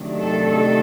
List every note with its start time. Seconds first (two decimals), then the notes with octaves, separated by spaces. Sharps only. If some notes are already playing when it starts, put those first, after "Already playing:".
Already playing: C3 D#3 F#3 A3 D4
0.20 A4
0.49 A4